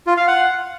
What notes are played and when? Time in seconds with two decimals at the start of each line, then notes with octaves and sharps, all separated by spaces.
0.07 F4
0.17 F5
0.27 F#5